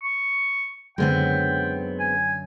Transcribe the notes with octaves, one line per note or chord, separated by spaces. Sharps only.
C#6
F#2 D3 G#3 B3 C4 G5
G#5